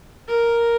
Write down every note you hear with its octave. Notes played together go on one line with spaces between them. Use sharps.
A#4